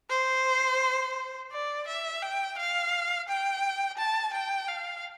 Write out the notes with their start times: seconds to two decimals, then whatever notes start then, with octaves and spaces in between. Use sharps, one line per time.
0.10 C5
1.51 D5
1.87 E5
2.22 G5
2.58 F5
3.28 G5
3.97 A5
4.33 G5
4.68 F5